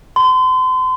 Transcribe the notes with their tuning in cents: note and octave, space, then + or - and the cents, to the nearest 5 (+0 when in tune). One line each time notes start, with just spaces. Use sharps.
C6 -35